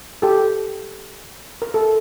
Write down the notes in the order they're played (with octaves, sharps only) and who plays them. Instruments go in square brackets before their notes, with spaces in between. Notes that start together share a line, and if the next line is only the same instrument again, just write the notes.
[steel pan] G4 A4
A#4
A4